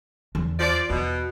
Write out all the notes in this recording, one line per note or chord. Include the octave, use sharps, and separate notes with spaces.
E2
F3 D5
E2 B2